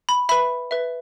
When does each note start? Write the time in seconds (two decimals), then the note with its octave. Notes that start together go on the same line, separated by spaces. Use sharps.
0.09 B5
0.29 B4 E5 B5
0.71 B4 E5